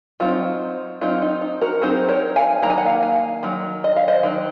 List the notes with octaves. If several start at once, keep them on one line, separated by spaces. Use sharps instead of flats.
F#3 C4 D#4 F4
F#3 C4 D#4 F4
D#4
D#4
F#4 A#4
F#3 C4 D#4 G#4 C5
A#4 C#5
F5 G#5
D#3 F#3 A#3 D#4 A#5
G#5
F#5
F5 G#5
F5 G#5
D#3 F#3
D#5
F5
C5 D#5
D#3 F#3